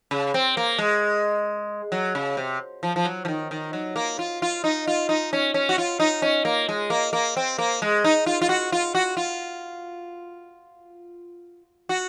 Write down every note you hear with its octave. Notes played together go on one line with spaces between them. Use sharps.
C#3
C4
A#3
G#3
F#3
C#3
C3
F3
F3
F#3
F3
D#3
D#3
F#3
A#3
F4
F4
D#4
F4
D#4
C#4
C#4
F#4
F4
D#4
C#4
A#3
G#3
A#3
A#3
C4
A#3
G#3
D#4
F4
F4
F#4
F4
F#4
F4
F#4